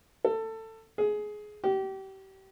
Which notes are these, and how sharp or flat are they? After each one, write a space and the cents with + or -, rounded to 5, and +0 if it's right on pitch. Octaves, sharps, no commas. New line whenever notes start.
A4 +20
G#4 +15
G4 -30